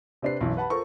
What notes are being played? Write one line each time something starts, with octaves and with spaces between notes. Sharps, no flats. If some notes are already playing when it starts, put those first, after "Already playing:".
C3 C4 D4 B4 C7
B1 F#2 E3
B4 F#5 A5 B5
F4 A4 A#4 C5 C#6